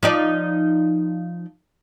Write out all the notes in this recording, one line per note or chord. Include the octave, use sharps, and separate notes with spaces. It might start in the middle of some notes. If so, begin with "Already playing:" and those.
F3 D#4 D5